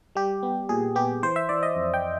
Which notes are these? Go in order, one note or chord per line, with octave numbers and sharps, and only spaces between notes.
G3 G4
B3
A#2 G#4
B3 G4
E3 C5
E5
E3 D5
D#5
F2
G5